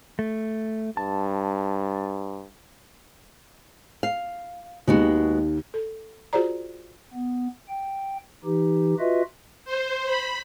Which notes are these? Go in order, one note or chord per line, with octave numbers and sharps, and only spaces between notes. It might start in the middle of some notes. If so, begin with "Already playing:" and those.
A3
G2 A5
F5
D#2 D#3 G#3 B3 F#4
A4
F4 F#4 G#4 C5 D5 A#5
B3
G5
E3 D#4 G4
F4 F#4 B4 D#5 E5
C5
B5